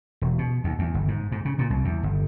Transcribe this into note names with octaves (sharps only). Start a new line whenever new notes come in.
E1
B2
D#2
E2
G1
G#2
G#2
C#3
A#2
C2
E2
G1